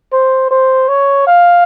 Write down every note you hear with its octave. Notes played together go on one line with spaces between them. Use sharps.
C5
C5
C#5
F5